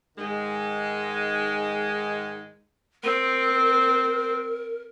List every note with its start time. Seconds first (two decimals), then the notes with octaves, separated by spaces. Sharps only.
0.18 G#2 D#3 G#3
3.03 C4 A#4